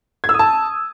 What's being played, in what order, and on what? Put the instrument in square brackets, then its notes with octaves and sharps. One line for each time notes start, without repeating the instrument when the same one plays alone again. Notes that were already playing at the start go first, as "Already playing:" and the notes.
[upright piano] G#6
E6
D#6
A5